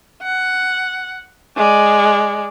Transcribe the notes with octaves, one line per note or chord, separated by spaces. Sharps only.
F#5
G#3 D5